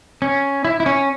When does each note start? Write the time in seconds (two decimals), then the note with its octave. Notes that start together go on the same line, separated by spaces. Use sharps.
0.22 C#4
0.65 E4
0.80 E4
0.86 C#4